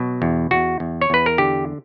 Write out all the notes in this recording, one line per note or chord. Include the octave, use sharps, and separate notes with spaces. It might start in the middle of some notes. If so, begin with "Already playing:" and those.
Already playing: B2 F#3
E2
E2 F#4
E2
C#5
E2 B4
A#4
D3 G4